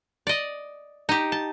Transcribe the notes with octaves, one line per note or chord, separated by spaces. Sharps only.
D5 D#5
D#4 G4
A5